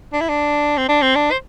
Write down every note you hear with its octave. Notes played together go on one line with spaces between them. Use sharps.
D4
E4
D4
C4
D4
C4
D4
C5